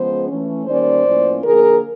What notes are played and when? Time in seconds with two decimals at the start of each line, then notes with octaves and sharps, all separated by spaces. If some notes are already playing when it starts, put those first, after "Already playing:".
Already playing: C#3 F3 G#3 B3 C5
0.28 E3 A3 C#4
0.66 D#3 G3 A#3 C#4 C5 D5
1.05 A2 F3 A#3 C#4
1.43 D3 F3 A#3 G#4 A#4